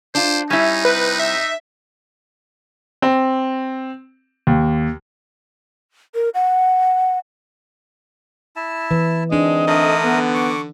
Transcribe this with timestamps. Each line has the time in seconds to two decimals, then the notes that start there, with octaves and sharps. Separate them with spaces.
0.15 D4 F4 C5
0.50 G3 C#4 D#4 E4
0.85 C3 B4
1.19 E5
3.02 C4
4.47 D#2
6.15 A#4
6.34 F#5
8.56 E4 E5 A5
8.91 E3
9.31 G#3 C4 D4 D#4 D#5
9.67 D3 A3 A#4 D#6
10.04 B3
10.34 C#6 D6